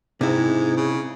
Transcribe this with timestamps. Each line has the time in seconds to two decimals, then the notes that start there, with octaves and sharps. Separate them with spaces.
0.21 G#2 C3 E4
0.77 C#3